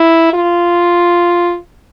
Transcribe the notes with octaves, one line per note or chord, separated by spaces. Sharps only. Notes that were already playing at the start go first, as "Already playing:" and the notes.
Already playing: E4
F4